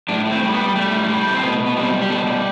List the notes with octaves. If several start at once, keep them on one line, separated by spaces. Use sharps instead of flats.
A2 D4
A2
C4
G3
B3
G3
G3 A3
A2
G3
A2
C4
B2 B3
B2
B3
G3 C4
G3
G4
B2 A4
G3